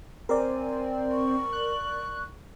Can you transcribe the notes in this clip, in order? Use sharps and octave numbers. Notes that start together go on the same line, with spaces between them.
C4 A#4 D5 G#5
C#6
F#6